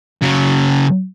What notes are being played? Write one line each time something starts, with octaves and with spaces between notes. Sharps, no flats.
C#3 F#3